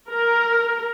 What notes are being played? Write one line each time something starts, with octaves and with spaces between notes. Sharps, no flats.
A#4